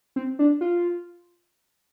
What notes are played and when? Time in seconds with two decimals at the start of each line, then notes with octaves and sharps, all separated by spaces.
0.16 C4
0.39 D4
0.61 F4